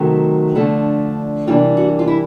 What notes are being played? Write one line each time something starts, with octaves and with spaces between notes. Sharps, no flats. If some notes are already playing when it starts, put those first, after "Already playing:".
Already playing: C3 D#3 F#3 A3
D3 F3 A3 D4
C3 E3 G3 A#3 D4 F4
F#4
F4
E4